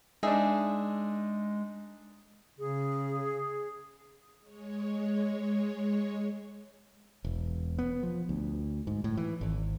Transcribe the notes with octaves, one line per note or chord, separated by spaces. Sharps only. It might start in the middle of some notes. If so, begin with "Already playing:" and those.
G#3 D4 D#4 G#4 E5
C#3 G#4
G#3 C#5
E1
B3
F3
D2
G#2
A2
E3
G#1